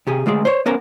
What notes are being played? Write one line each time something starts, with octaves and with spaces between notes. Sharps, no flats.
C3 G4 G#4
D2 G#3 F4 G#4
C5 C#5
B3 C#4 A#4 C5 A#5